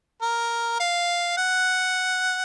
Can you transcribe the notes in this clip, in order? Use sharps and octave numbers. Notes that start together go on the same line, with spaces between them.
A#4
F5
F#5